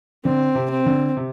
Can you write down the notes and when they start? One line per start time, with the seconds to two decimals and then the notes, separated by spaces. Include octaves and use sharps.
0.25 D3 C4
0.55 C3
0.70 C4
0.86 D3
1.17 C3